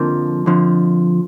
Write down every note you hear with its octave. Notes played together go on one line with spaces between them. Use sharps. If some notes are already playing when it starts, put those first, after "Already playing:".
Already playing: F2 D3 F3 A#3
F2 D3 F3